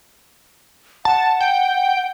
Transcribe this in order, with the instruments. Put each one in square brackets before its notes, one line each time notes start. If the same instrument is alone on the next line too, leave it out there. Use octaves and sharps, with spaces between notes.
[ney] F#5 [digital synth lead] A5
[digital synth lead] G5